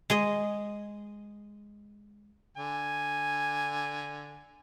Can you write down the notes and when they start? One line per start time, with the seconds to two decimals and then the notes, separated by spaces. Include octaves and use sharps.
0.10 G#3 G#4 D#5
2.57 D3 G#5